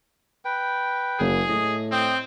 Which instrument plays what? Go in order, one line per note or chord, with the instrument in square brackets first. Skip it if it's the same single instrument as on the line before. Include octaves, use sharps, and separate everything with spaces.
[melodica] B4 G5
[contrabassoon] F#1 [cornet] G#4
[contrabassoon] A2 [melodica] D#5
[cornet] C4 [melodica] D#5 G5